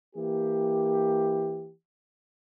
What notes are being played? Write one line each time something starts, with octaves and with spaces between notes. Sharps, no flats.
E3 A#3 G4